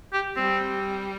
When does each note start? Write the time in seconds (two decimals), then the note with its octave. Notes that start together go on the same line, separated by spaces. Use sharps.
0.13 G4
0.37 G3 C4